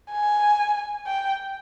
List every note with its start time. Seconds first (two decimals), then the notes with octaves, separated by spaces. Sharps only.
0.12 G#5
1.07 G5